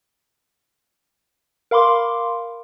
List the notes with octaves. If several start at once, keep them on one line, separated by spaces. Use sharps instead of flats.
A#4 F5 B5 C6 D6